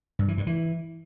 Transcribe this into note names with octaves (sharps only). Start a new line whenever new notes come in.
G2
E3
G2
E3